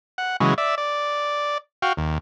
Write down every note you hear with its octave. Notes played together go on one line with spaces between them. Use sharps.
F#5
C#3 E3 F#3 G#3
D5 E5
D5
F#4 F5 G5
D#2